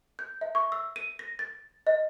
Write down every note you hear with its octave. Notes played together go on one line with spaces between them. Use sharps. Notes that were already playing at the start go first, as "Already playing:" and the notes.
G6
E5
C#6
E6
D#7
A#6
A6
D#5